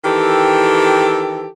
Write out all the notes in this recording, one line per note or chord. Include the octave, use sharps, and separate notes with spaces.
D#3 E3 G4 A4